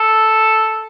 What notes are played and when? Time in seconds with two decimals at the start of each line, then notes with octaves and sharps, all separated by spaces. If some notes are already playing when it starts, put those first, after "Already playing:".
Already playing: A4